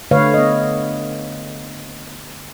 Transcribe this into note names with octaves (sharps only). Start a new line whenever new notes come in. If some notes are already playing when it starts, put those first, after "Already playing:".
D3 A3 B4 C#5 F5
B3 D#5